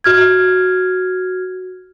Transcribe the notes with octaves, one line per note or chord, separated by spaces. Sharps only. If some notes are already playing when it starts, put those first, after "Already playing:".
F#4 F6 G#6